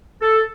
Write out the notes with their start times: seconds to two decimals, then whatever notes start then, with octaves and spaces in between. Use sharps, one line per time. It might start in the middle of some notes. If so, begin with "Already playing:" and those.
0.22 A4